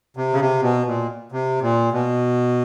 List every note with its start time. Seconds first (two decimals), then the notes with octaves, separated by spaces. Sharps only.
0.17 C3
0.33 C#3
0.40 C3
0.62 B2
0.86 A#2
1.32 C3
1.62 A#2
1.93 B2